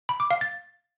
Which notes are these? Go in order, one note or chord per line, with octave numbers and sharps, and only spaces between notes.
B5
D6
F5
A6